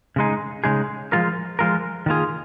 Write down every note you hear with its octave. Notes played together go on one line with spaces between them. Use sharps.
C#3 G#3 D#4 G#4
C#3 G#3 D#4 G#4
F3 G#3 F4 A#4
F3 G#3 F4 A#4
D#3 A#3 F4 G#4